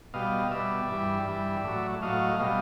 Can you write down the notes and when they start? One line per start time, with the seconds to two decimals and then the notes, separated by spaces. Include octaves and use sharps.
0.14 B2 G3 D#5 F5
0.51 B2 G3 D5 E5
0.89 G2 E3 G3
1.27 G2 E3 G3
1.64 A2 F#3
2.02 A2 F#3 D#5 F5
2.40 B2 G3 D#5 F5